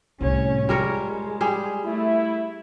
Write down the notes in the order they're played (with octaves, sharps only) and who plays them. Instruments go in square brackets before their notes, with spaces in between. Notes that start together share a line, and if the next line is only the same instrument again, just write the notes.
[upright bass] C2 A2 [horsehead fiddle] C#4 C#5
[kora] G3 A#4 C#5 [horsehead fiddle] G#3 [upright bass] F4
[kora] G3 G#4
[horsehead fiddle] A3 [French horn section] E4